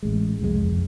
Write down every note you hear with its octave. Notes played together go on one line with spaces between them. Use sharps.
A1 G#3
C2 F2 G#3
F2